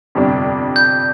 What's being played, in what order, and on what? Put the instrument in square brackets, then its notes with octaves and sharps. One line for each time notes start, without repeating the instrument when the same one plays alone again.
[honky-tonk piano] G1 F2 C3 G3 D4
[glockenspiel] G6